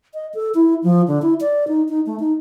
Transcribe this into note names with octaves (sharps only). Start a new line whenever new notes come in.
D#5
A4
E4
F3
D3
E4
D5
D#4
D#4
A3
D#4